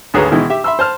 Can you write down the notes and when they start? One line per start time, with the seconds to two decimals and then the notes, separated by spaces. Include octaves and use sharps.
0.14 G#1 D2 G#4 B4 C#5 A#5
0.32 B2 D#3 E3 G#3
0.50 G4 E5
0.64 E5 B5 C6 E6
0.79 C5 A5 F6